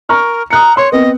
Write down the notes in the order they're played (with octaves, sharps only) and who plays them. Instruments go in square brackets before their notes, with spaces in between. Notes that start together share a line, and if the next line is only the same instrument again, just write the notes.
[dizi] A#4 [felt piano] A#5 C#6 F6
[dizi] A#5 [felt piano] D#6 F#6 C#7
[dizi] C#5 [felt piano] C6
[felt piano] B3 C4 B4 [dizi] D#5